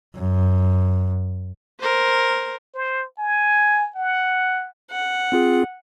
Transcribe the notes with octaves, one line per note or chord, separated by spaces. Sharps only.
F#2
A#4 C5
C5
G#5
F#5
F#5
C4 F4 G#4